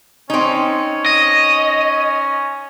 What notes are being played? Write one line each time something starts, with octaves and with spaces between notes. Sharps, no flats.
C4 C#4 D#4
D#5